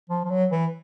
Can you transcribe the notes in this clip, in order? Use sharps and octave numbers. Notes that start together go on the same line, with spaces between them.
F3
F3
F#3
E3